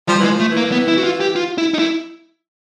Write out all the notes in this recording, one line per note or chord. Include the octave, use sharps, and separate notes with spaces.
F3 G3
E3 G#3
F3
A3
E3
A#3
B3
E4
F#4
F4
G4
F4
E4
D#4
E4